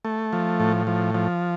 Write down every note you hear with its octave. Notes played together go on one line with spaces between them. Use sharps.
A3
F3
A2
F3
F3